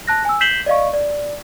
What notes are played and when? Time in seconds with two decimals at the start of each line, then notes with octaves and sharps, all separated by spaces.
0.07 A5 F#6 A#6
0.25 G#5 E6
0.41 G6 B6 C7 E7 F#7 G7
0.66 D5 D#5 F5 C#6
0.94 D5